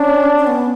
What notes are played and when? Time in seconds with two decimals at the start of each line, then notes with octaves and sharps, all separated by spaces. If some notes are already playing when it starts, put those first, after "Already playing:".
Already playing: C#4 D4
0.37 C#4
0.47 B3